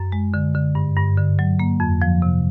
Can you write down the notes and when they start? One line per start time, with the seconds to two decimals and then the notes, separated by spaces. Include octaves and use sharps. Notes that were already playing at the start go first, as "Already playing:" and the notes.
Already playing: F#2
0.12 G#3
0.34 D3
0.54 D3
0.75 G2
0.97 G2
1.17 D3
1.39 F#3
1.59 A#3
1.80 F2
2.02 F3
2.22 C3